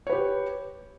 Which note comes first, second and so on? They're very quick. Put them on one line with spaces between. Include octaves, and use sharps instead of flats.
C#5 B4 G4